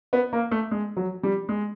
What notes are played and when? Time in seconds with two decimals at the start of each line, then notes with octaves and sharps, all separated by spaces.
0.13 B3
0.33 A#3
0.51 A3
0.71 G#3
0.97 F#3
1.23 G3
1.49 G#3